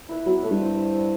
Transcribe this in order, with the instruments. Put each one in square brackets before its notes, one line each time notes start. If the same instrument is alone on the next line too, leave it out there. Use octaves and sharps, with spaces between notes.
[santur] E4 B4 E5
[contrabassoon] F#3 [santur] B3
[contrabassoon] A2 [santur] E4 B4 E5
[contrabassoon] G2
[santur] C4
G4 D5
C4